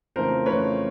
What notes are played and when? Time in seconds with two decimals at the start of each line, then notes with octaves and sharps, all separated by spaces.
0.16 F2 C#3 E3 A3 A#4 C5
0.46 F2 C#3 E3 A3 B4 C#5